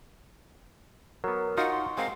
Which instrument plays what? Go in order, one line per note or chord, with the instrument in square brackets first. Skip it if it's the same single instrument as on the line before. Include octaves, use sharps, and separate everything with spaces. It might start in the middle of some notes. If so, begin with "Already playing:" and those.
[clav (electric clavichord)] F#3 B3 [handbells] A#4
[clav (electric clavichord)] D#4 F4 F5 [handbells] F#4 [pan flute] F#5
[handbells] C6
[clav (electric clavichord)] G#3 C4 A#4 [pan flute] F5